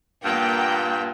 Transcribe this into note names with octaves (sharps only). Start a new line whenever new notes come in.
G2 A#2 A#3 F#5 G5